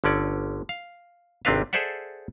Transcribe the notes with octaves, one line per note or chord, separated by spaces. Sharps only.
G1 D3 C#4 D5
F5
G#1 C3 C4 D4 B4 F5
G#4 A4 C5 D5 E5 F#5